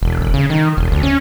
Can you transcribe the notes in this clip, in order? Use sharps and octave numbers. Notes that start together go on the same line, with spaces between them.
E1
E1
C#3
D#3
E1
D2
C#4